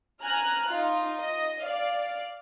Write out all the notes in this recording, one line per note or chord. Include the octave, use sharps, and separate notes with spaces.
G#5 A#5 F6 F#6
D#4 F4
D#5
D5 F5